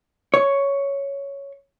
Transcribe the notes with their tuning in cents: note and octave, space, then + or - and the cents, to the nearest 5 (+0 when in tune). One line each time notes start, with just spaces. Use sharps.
C#5 +5